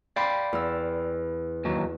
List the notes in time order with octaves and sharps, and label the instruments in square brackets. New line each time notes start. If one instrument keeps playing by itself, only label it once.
[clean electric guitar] D5 F5 G5 [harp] B5 C6
[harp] E2 E6
[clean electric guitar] D#2 F#3